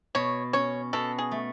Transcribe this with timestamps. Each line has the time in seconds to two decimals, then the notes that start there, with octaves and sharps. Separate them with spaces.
0.15 B2 C#5
0.53 C#4 C#5
0.93 B2 A4
1.18 G#4
1.31 A3